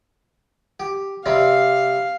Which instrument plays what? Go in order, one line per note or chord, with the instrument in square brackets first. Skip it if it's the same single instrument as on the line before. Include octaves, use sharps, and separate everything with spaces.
[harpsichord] G4
[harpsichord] C3 G3 C4 [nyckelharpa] F5